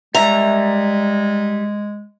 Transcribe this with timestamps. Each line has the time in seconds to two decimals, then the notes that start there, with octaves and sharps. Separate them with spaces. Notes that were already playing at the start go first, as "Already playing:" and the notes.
0.15 G3 G#3 E5 A#5